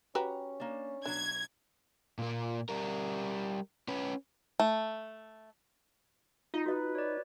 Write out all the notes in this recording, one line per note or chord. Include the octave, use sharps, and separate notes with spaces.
C#4 F#4 G4 B4 A#5
A#3 D4
B2 F#3 D4 G#6
A#2 A#3
G3 A#4
C#4 B4
A3
D#4 F4
F#4 B4 D#5
C#5 D5